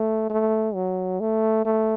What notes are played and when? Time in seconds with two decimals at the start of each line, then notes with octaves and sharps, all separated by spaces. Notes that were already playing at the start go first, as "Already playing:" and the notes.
Already playing: A3
0.30 A3
0.75 F#3
1.20 A3
1.65 A3